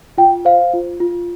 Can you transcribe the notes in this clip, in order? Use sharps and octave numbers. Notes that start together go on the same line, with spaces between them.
F4 G5
C5 F5
F4
F4